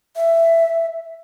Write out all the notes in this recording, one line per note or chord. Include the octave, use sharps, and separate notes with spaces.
E5